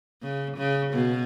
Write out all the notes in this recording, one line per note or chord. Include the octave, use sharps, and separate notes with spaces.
C#3
C#3
B2